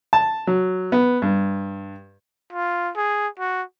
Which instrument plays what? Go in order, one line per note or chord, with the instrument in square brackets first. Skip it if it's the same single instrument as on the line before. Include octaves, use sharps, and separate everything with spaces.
[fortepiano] A5
F#3
B3
G2
[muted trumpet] F4
G#4
F#4